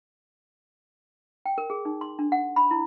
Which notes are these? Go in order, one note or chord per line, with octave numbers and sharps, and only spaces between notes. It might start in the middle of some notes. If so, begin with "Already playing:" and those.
G5
A#4
G#4
D#4
C6
D4
F#5
B5
E4